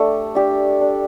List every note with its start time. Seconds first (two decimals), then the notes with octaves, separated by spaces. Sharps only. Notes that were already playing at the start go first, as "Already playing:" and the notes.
Already playing: A3 D4 G4
0.35 D4 G4
0.81 D4